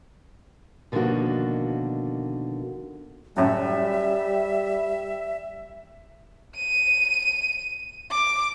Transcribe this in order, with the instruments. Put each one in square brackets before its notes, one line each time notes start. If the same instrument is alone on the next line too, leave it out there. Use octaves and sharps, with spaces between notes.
[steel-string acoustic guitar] B2 D3 D#3 F3 A#3 F#4
[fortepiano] F#2 A2 C#4 [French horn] G3 [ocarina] E5
[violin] D#7
D6